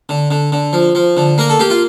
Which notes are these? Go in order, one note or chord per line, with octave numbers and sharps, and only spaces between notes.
D3
D3
D3
F3
F3
D3
A#3 A#4
A4
A#3 G4
F4